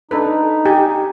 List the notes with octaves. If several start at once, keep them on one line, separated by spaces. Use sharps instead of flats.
D4 D#4 A4 B4
G4 G#4 G#5